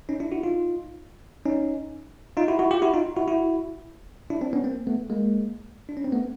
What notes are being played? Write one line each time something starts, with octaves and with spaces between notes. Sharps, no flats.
C#4 D#4
D4 E4
E4 F#4
D#4 F4
C#4 D#4
D#4 F4
E4 F#4
E4 F#4
F4 G4
E4 F#4
D#4 F4
E4 F#4
E4 F#4
D4 E4
C4 D4
B3 C#4
A#3 C4
A3 B3
G#3 A#3
D4
C#4
C4
A3 B3